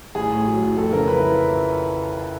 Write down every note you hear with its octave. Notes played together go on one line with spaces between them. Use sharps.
A1 G#4
A2
F#3
A1
F2 A4
C#3 A#4
F3 B4
E4